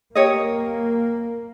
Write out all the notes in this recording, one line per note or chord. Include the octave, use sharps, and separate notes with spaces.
A#3 G4 C#5 D#5